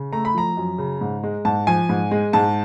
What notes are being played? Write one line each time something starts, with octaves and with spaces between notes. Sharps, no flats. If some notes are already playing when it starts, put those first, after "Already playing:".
Already playing: C#3
A3 A#5
B5
F3 A#5
F#2
C#3
G#2
G#3
G#2 A5
F3 G#5
G#2
G#3
G#2 A5